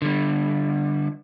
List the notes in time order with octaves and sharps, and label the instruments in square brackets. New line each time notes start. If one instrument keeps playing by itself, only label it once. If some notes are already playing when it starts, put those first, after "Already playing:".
[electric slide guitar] D3 G3